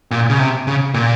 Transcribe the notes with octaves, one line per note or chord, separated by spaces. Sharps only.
A#2
C#3
C3
C#3
A#2